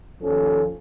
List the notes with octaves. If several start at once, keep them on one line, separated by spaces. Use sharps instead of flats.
D#2 F3 C#4 A4